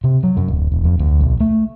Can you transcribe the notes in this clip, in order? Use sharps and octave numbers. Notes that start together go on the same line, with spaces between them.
C3
F#3
F#2
D1
E1
F2
D2
B1
A3